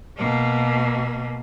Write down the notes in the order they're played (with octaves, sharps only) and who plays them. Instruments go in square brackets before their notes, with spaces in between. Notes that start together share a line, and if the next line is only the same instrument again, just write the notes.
[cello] B2 A#3